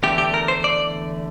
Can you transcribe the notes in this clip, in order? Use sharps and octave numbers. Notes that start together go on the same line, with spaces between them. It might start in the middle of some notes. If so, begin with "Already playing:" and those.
E2 D3 A3 G4
G4
A#4
C5
D5